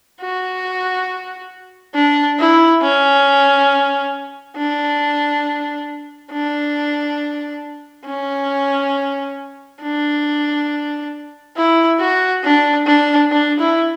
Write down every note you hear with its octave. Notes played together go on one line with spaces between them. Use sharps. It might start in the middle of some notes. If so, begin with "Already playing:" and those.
F#4
D4
E4
C#4
D4
D4
C#4
D4
E4
F#4
D4
D4
D4
E4